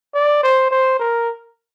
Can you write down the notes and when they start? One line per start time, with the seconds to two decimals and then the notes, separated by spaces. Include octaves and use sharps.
0.14 D5
0.43 C5
0.71 C5
1.00 A#4